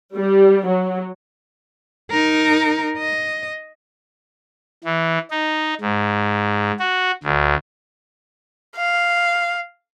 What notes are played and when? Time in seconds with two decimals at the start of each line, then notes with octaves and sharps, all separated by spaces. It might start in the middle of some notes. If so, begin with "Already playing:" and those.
0.14 G3
0.67 F#3
2.11 D#4 A#4
2.98 D#5
4.84 E3
5.31 D#4
5.81 G#2
6.79 F#4
7.24 D2
8.77 F5